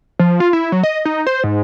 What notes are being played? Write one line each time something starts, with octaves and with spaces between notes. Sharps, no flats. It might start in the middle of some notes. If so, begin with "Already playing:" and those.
F3
F4
E4
F#3
D#5
D#4
C5
G#2